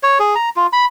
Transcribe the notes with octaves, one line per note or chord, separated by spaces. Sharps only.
C#5
G#4
A#5
F4
B5